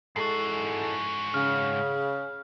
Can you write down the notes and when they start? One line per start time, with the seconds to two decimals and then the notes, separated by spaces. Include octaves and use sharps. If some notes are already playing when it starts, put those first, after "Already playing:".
0.16 G#2 G#3 E4 F#4 A4 C7
1.34 C#3 F6